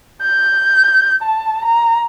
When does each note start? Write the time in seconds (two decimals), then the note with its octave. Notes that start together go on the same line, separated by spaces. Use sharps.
0.22 G6
1.22 A5
1.65 A#5